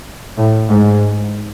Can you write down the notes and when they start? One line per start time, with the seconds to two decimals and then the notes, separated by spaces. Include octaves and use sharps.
0.38 A2
0.70 G#2